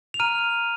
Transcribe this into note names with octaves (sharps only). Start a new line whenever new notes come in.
F7
A#5 F6 D#7